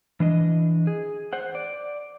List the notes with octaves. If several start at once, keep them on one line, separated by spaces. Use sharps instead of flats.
E3 D4 D#5
G#4
C5 F#5
D5